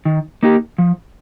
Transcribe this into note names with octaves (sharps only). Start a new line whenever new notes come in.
D#3
A#3 D#4 G4
F3